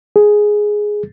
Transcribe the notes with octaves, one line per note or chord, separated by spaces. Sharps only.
G#4